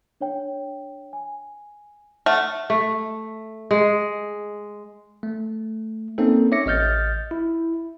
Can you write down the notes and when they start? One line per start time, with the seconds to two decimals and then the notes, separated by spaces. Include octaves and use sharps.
0.20 D4 C#5 G5
1.13 G#5
2.26 A3 F#5 F6
2.70 A3
3.71 G#3
5.23 A3
6.18 A#3 C4 C#4 D#4 A4
6.52 C#5 E5 D6 A#6 C#7
6.66 A1 D#5 F6 G6 A6
7.31 E4